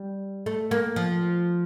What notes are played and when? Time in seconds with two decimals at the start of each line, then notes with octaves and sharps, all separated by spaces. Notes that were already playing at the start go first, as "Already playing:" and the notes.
Already playing: G3
0.46 A3
0.71 A#3
0.96 F3